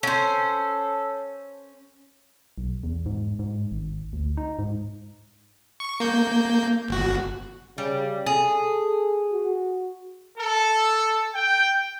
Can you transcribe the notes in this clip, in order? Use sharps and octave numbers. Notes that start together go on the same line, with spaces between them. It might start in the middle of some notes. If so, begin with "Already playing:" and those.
C#4 A4 C5
B1
E2
G#2
G#2
G#1
D2
D#4
G#2
C#6
A#3 G6
G1 F#4
C#3 G3
G#4 A4
F#4
A4
G5